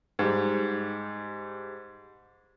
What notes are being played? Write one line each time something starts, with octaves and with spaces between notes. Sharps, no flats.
G#2 G3